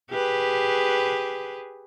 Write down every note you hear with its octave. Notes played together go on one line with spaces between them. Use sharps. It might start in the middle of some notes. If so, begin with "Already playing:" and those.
G4 G#4 B4